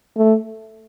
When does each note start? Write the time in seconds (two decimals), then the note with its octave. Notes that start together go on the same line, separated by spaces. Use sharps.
0.17 A3